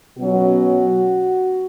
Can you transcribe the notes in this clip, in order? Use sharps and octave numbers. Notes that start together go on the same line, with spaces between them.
B2 F#3 C#4 F#4